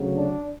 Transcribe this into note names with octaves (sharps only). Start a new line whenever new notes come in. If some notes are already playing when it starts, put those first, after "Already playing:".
Already playing: D2 C#3 F#3
D4